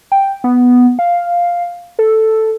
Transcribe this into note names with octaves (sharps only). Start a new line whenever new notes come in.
G5
B3
F5
A4